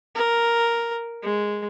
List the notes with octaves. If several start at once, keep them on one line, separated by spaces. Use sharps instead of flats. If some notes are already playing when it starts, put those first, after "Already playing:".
A#4
G#3